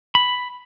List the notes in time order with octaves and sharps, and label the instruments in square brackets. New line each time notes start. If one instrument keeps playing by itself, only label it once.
[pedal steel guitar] B5